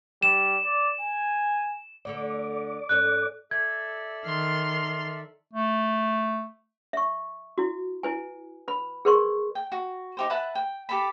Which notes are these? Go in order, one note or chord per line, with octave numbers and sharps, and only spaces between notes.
G3 E7
D5
G#5
D2 D3 A4 D5
G#2 C#4 A4 F#6
A4 D5 E5 G#6
D#3 C6 F6
A3
E5 C#6
E4 F#4
E4 B4 G#5
B4 B5
G#4 A#4 B4 D5 C6 C#6
G5
F#4
D#4 G4 C5
B4 E5 F#5 A5
G5
G4 A4 A5 B5